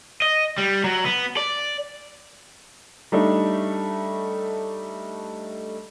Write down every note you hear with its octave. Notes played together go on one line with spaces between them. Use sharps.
D#5
G3
F#3
B3
D5
G3 A3 D4 D#4